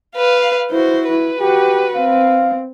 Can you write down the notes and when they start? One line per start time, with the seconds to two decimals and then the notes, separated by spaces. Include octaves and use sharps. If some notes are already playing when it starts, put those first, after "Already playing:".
0.16 B4 F5
0.71 E4 F#4 C5
1.09 E4 B4
1.40 F#4 G4
1.95 C4 F5